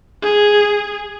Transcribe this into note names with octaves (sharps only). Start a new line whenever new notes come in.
G#4